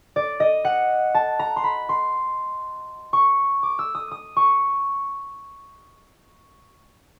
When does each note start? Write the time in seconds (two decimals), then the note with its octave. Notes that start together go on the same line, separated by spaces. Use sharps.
0.16 D5
0.40 D#5
0.65 F#5
1.14 A5
1.39 A#5
1.56 C6
1.64 B5
1.89 C6
3.13 C#6
3.63 D6
3.79 E6
3.95 D#6
4.11 D#6
4.36 C#6